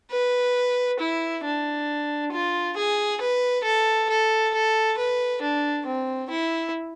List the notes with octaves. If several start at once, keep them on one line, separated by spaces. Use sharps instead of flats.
B4
E4
D4
F4
G#4
B4
A4
A4
A4
B4
D4
C4
E4